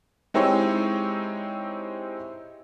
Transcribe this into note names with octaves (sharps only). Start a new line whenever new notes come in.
G#3 C4 D#4 E4 G4 C#5